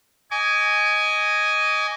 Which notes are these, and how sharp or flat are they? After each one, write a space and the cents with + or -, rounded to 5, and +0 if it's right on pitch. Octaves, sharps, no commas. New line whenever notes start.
D#5 +0 G#5 +0 D6 -45